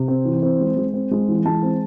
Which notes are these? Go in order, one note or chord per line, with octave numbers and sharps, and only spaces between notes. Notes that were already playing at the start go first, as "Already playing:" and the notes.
Already playing: C3
C4
E3
C4
G#3
G#3
C4
G#3
E3
G#3 A5
C4